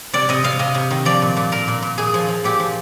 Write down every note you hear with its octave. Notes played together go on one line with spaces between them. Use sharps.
C3 D5
C3 D#5
C3 F5
C3 D#5
C3
D#3
F3 D5
A#2
A#2
A#2 A#4
A#2
A#2
A#2 G#4
F3
F3
A#2 G4
F3